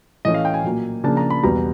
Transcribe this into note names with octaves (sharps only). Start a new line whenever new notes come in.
A2 E3 A3 C#4 D#5
F5
G5
G#5
A#2 F#3 A#3
C#3 F3 A#3 D4 A5
A#5
B5
E2 B2 G3 B3 A#5